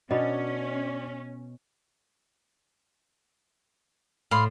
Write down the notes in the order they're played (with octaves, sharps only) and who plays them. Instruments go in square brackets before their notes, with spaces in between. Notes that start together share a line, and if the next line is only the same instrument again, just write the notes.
[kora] B2 [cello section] C#4 [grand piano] D4 [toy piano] D#5 B5
[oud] A2 [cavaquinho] F5 B5 C6